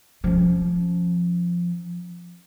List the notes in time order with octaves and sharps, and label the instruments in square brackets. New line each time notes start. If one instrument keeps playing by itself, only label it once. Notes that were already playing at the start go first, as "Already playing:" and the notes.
[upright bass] F3 C#4